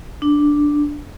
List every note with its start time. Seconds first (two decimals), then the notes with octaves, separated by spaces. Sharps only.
0.22 D4